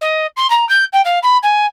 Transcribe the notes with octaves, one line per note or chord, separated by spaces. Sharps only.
D#5
C6
A#5
G6
G5
F5
B5
G#5